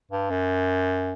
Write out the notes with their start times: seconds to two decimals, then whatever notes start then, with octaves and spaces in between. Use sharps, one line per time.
0.11 G2
0.30 F#2